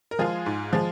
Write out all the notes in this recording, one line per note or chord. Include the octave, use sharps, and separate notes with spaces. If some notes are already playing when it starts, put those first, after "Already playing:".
A#4
F3 G#3 F4 G#4
G#2
F3 G#3